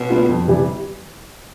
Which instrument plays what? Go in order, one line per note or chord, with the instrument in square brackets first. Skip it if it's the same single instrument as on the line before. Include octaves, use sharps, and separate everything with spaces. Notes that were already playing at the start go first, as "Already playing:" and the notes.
Already playing: [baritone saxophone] B2
[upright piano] G3 B3 F4
F2
C3 E3 G3